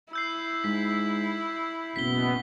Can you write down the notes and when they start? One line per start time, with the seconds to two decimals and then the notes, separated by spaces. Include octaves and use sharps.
0.13 E4 E6 G6 C7
0.64 G#2 B6
1.96 F#1 B2 B3 B6 G7